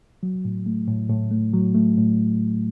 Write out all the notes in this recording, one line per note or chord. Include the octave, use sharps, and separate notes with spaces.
F#3
A2
A3
A2
A2
A3
F#3
A3
A2